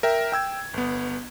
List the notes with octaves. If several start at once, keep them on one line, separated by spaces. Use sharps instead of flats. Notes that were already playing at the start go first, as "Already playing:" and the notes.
A#4 E5 G5
G5 E6 G#6
G1 B3